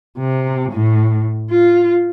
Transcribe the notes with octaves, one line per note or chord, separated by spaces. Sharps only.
C3
A2
F4